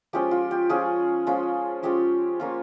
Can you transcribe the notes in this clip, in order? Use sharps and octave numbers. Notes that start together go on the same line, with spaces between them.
F3 G#3 C#4 F4 G4
F4
G4
F3 G#3 C#4 F4 G#4
F3 G#3 C#4 F4
F3 G#3 C#4 F4 G4
A#3 C#4 F4